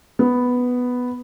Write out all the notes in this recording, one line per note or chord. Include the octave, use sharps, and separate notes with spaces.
B3